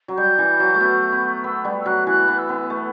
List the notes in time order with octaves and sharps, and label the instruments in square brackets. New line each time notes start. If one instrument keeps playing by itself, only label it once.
[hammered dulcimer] F#3
[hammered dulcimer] G3 [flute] G6
[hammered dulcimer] E3
F#3
A3
B3
B3
[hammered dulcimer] B3 [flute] E6
[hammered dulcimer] G3
[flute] E6
[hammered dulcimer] F#3 [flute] F#6
[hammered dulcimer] E3 [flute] F#6
[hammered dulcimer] B3
[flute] E6
[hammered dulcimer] B3
A3